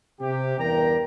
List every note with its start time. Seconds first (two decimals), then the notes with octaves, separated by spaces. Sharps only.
0.20 C3 G4
0.58 E2 G2 A#4 D5 G5 A#5